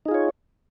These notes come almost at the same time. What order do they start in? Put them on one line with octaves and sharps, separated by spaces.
D#4 G#4 F4 C#5